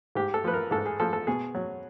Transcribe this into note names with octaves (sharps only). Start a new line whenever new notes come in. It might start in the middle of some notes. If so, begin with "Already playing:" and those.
G#2 G4
A4
F3 B4
A#4
G#2 A4
G#4
F3 A4
A4
B2 G#4
F#3